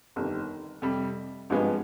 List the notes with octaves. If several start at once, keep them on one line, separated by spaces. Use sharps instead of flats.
G1 F2 D#3
F2 C3 G3
G#1 G2 F3 G#3 B3